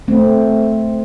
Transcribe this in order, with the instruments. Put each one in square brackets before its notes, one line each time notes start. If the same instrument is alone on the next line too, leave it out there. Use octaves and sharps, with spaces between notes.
[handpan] A3 C4